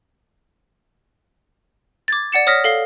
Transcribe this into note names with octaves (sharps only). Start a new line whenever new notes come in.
D6 G#6 A6
D5 F#5 C#7 E7
C#5 D#6 F6 A#6 B6
A4 F5 G7